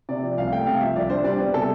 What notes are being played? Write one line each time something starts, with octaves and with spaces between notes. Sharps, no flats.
C3 D5
F3
C2 F5
A3 G5
C3 F5
F3 E5
C2 D5
D4 C5
G3 D5
B3 B4
C3 A4